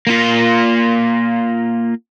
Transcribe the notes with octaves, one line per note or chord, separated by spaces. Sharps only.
A#3 F4